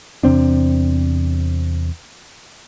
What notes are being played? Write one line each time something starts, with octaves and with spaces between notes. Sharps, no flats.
E2 C3 C4 D4